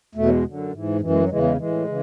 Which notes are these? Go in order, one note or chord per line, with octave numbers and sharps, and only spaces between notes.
E2 B2 A3
F#3
G#3
F#2 D3
G#2 E3
F#2 E3 G#3
G#3
F#3
E2 C#3 E3 G#3
G#3
A2 E3 G#3
C#3 E3